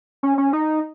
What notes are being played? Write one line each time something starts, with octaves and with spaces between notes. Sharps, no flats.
C#4
C#4
D#4